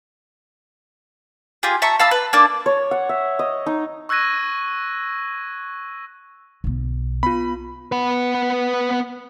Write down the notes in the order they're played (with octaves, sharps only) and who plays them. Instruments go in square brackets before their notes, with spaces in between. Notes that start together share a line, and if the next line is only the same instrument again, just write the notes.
[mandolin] F4 G4 G#4
E5 A5 A#5 C#6
F5 A5 B5 E6
B4
A#3 D4
[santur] C#5
F#5
E5
D#5
D#4
[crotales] C#6 E6 F#6 G#6 A#6 D#7
[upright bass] B1 B3
[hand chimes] B3 F4 [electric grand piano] B5
[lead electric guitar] B3 B4